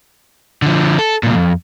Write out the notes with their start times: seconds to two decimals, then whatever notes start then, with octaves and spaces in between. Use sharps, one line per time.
0.62 D3 F3
0.99 A4
1.23 C2 A#2
1.35 F2